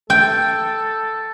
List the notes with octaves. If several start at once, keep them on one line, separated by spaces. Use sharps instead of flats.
A4 G5